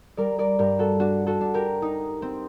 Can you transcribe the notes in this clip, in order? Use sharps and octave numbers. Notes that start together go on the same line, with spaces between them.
G3 A#4 D5
A#4 D5
G2 G4 A#4
F#4 A4
D4 F#4
F#4 A4
D4
G4 A#4
D#4
C4